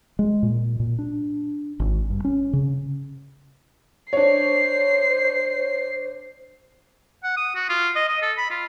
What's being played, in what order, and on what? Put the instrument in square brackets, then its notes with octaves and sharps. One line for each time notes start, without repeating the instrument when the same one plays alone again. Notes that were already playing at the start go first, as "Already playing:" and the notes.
[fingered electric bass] G#3
A#2
A#2
D4
G#1
G2
C#4
C#3
[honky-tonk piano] D4 C#5 [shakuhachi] C5 [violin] C7
[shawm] F#5
D#6
F#4
F4
D#5
D#5
A4
B5
F4